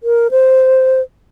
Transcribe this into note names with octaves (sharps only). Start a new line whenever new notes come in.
A#4
C5